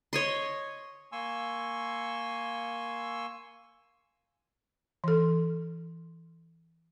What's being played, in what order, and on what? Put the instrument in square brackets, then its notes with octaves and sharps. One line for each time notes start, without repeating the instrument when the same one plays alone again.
[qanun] C#5 D#5 C6
[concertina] A#3 G#5 C6 C#6 E6
[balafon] E3 A4